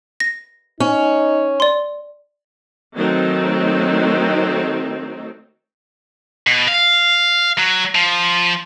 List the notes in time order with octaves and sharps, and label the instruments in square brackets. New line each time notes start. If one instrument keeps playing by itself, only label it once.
[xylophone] A#6
[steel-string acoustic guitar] C#4 [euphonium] D#4
[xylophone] D5 C6
[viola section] D#3 F#3 A3 C4 D#4
[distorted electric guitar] B2
F5
F#3
F3